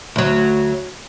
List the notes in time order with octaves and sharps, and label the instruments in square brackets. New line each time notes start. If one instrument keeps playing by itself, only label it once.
[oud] D2 F#3